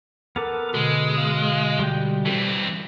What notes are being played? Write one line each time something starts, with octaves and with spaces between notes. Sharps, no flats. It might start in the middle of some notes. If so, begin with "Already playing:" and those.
B3 A4 A#4 F#5 A#5 D6
B2 D3 G#3
F5
G3 G5
E3 C4